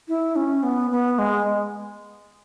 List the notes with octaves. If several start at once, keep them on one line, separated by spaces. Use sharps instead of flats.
E4
C#4
B3
B3
G#3